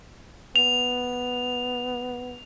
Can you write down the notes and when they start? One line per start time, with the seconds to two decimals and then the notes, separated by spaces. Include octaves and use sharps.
0.56 B3 F7